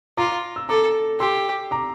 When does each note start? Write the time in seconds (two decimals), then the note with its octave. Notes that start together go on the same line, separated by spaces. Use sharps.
0.17 F4 A#5 D6
0.56 E6
0.69 A4 A#5 D6
1.20 G4 C6 E6
1.71 A#5 D6